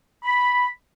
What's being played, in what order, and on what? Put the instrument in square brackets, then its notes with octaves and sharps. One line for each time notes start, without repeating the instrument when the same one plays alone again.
[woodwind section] B5